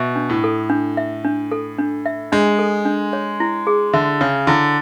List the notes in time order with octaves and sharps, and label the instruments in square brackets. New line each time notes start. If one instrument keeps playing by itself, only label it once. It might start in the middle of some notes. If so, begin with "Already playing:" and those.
Already playing: [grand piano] B2 [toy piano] E5
[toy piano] D4
[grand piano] A2
[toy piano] A4
D4
E5
D4
A4
D4
E5
[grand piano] G#3 [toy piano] D4
[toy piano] A4
D4
C#5
E4
G#4
[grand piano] D3 [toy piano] E5
[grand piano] C#3 [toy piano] C#5
[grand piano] D3 [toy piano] E4